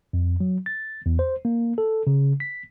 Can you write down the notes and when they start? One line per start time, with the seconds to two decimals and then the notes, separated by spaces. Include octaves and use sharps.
0.13 F2
0.40 F#3
0.66 A6
1.06 E2
1.19 C5
1.45 A#3
1.78 A4
2.07 C#3
2.40 B6